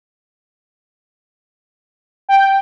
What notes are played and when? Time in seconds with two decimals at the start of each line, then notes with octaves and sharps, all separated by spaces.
2.29 G5